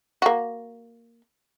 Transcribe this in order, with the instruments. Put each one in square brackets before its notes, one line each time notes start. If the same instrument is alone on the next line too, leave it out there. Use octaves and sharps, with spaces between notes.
[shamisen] A#3 F#4